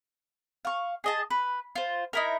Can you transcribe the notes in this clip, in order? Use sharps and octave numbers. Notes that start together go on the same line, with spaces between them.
F5 C#6
G#4 D#5 A5
B4
F4 C5
D#4 E4 A#4